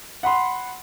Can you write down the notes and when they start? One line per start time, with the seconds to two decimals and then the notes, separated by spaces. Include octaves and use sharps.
0.23 F#5 B5 C6